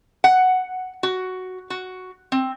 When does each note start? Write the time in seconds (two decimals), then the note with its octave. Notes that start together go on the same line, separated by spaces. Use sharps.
0.24 F#5
1.03 F#4
1.70 F#4
2.32 C4